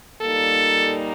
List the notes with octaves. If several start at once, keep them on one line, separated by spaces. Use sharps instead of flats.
A#2 G3 A#3 D#4 A4